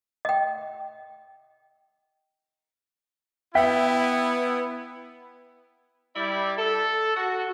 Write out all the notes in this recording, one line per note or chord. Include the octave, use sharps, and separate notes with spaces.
D#5 G5
B3 E4 E5 G5 B6
G3 E4 D5
A4
F#4